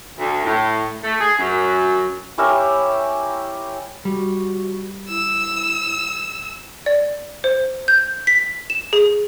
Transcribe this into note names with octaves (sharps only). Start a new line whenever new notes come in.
D2
A2
A3
G#4
F#2
C#4 E4 G4 A#4
G3 F#4
E4 E6
D5
C5
G6
B6
E7
G#4